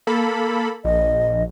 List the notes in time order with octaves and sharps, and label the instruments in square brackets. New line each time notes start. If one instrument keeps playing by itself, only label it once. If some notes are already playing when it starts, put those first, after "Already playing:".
[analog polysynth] A#3 A4 B5
[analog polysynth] A#1 [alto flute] D#5